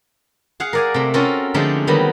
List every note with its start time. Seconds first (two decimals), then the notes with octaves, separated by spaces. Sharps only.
0.60 G#4 F5 F#5
0.73 A#4 D5 G#5
0.94 C3 A3
1.14 C4 C#4 F4 F#4 A4 A#4
1.54 D3 F3 G#3 A3 D4 D#4
1.87 D#3 F#3 G3 B3